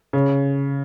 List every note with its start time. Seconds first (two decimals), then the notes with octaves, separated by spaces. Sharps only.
0.13 C#3